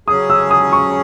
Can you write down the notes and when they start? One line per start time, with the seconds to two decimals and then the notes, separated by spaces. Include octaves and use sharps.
0.08 C#3 F#3 C#4 G#4 D#6
0.30 E6
0.51 D#6
0.73 C#6